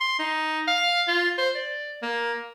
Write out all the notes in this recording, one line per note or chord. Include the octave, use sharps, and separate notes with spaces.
C6
D#4
F5
F4
C5
D5
A#3